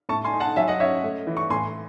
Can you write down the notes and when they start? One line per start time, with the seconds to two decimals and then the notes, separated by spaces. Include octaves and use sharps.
0.09 A2 A5 C#6
0.25 G#5 C6
0.33 D#4
0.40 F#5 A5
0.56 F#3 E5 G#5
0.68 D#5 F#5
0.80 C#4 C#5 E5
1.03 A3
1.27 E3
1.37 C#6
1.50 A2 G#5 C6